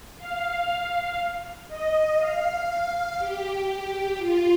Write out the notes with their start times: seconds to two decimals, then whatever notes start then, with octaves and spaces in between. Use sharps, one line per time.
0.18 F5
1.68 D#5
2.18 F5
3.18 G4
4.18 F4